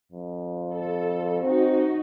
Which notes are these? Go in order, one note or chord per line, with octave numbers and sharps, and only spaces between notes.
F2
A4
C4 D#4 F#4